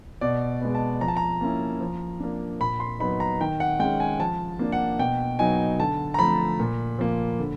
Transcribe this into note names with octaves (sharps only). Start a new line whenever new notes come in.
B2 D5
G#3 B3
A5
F3 A#5
A5
A#5
A#3 C#4 E4
F3
A#3 D4
A#2 B5
C6
F#3 B3 D#4 B5
A#5
D#3 G5
F#5
G#3 C#4 G5
G#5
F3 A5
A#3 D4
F#5
B2 G5
F#3 B3 D#4 G#5
D3 A5
A#5
F3 A3 B5
A#2
F3 A#3
D3